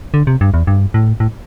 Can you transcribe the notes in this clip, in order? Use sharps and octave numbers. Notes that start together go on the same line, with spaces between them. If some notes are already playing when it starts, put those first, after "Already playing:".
D3
C3
G2
E2
G2
A2
A2